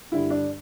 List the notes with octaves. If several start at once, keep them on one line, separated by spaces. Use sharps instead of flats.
G2 D3 G3 E4
D4